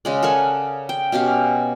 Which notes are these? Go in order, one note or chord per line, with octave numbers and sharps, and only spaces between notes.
C#3 G#3 D5
A4 A#4 F#5 G#5
G5
B2 C#4 G4 F5